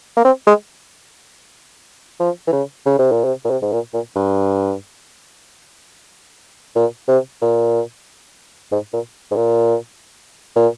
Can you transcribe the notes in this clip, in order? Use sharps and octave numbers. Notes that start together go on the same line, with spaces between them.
A#3
C4
G#3
F3
E3
C#3
C#3
C3
A#2
C3
A#2
C3
G#2
A#2
A#2
G2
A#2
C3
A#2
G#2
A#2
G#2
A#2
A#2